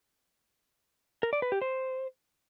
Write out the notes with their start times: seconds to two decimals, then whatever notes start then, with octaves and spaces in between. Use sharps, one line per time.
1.23 A#4
1.33 D5
1.42 B4
1.52 G4
1.62 C5